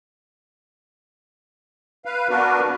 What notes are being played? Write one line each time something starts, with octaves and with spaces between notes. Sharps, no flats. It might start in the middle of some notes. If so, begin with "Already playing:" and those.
B4 F5
B3 D4 F#4 A#4 B4